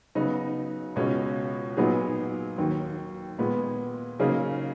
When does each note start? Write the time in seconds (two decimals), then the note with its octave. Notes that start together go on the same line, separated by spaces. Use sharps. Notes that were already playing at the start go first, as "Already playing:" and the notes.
0.15 C#3 F#3 B3 D#4 F#4
0.96 C#2 B2 G#3 C#4
1.77 A#2 F#3 B3 D#4 G#4
2.58 D#2 D#3 F#3
3.38 A#2 G#3 B3
4.19 C#3 F#3 A#3 D#4 G#4